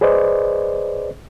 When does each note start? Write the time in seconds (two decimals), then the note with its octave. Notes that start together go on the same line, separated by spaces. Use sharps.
0.01 G#4 B4 C5 D5 D#5